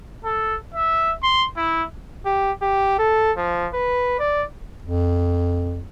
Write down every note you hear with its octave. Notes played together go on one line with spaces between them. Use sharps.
A4
E5
C6
E4
G4
G4
A4
F3
B4
D5
F2